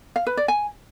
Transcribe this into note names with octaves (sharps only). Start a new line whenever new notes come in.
F5
B4
D5
G#5